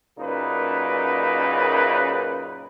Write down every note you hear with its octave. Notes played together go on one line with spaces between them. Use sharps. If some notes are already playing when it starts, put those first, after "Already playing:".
F#2 A#2 C#3 D#4 B4